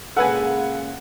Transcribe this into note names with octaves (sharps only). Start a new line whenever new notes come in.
A#2 C#3 G#3 A4 B4 F#5 G#5